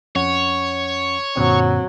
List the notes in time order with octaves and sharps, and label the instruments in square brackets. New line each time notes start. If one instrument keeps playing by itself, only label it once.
[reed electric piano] F2 C#4 F#5 [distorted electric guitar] C#5
[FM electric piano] F#2 A#2 D3 [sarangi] F#3 [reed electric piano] C4